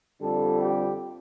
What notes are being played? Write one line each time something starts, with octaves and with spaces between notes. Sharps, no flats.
F2 D3 G3 A4
G4